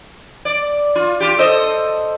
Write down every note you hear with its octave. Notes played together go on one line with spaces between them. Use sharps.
D5
F4
F4 G4
A4 C5 D#5